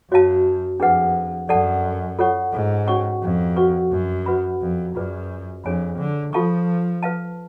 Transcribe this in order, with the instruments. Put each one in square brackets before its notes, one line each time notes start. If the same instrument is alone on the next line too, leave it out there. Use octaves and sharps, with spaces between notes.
[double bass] F#2 [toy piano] F#4 C#5 F5 A5
[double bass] F2 [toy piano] D4 G#4 B4 F#5
[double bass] F#2 [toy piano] A4 D5 F#5 A5
[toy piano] F4 A4 C#5 F#5 C#6
[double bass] G#2
[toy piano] C#4 F#4 C#5 F#5 C#6
[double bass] F2
[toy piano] F#4 B4 F#5 C#6
[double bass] F#2
[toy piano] F#4 B4 F#5 B5
[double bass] F2
[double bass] F#2 [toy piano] F4 G#4 B4 D5
[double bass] F2 [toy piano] D4 G#4 C#5 G#5 B5
[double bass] D3
[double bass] F3 [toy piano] F4 A4 F5 A5 C#6
[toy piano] B4 F5 A5